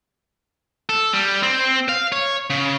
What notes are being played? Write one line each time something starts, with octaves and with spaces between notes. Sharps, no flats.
A4
G3
C4
F5
C#5
C#3